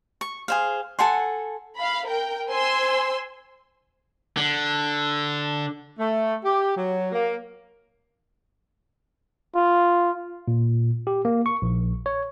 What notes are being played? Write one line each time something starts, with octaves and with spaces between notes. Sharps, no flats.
C#6
G#4 C5 F5
A4 F#5 G#5 C6
F5 B5
A#4 G5
C5 G#5 C6 E6
D3
A3
G4
F#3
A#3
F4
A#2
G4
A#3
C#6
A#1
C#5